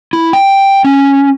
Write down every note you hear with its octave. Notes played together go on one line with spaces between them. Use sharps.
E4
G5
C#4